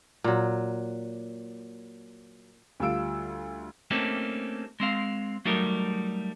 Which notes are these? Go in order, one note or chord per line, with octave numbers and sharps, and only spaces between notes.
A#2 F#3
D2 G3 F4 E6 D7
A3 A#3 C4 C#4 D#4 G4
G#3 C4 F5
F#3 G3 A3 D#4 A#4